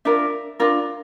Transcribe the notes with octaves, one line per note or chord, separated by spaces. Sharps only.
D4 F4 A#4 E5
D4 F4 A#4